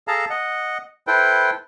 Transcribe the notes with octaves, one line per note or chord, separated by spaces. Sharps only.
G#4 A4 F5 A5 A#5
D#5 F#5
E4 A4 B4 C5 G5